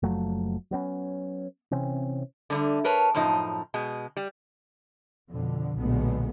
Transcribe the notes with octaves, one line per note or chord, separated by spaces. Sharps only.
F#1 F3 F#3 A3
F#3 B3 C#4
C3 E3 C4 C#4
D3 G3 A3
A#4 B4 C#5 A5
F#2 A2 F3 D#4
B2 G#3
G3
F2 B2 D3
B1 A#2 D3 G#3 A3 B3